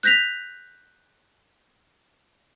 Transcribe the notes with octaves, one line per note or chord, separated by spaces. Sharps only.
F#6 G6 A#6 B6 F7